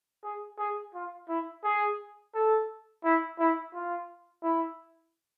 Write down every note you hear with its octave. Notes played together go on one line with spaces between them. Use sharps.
G#4
G#4
F4
E4
G#4
A4
E4
E4
F4
E4